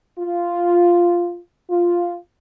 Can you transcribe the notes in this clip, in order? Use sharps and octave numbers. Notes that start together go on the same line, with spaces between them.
F4
F4